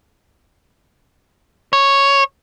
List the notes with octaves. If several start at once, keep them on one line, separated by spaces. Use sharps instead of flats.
C#5